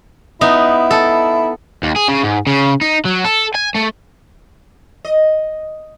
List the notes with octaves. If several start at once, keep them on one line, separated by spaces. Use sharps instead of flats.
B3 D#4 E4
A4
D#2
G#4
C#3
G#2
C#3
D#4
F#3
A4
G#5
A3
D#5